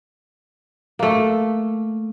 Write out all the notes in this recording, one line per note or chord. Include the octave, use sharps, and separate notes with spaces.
A3 A#3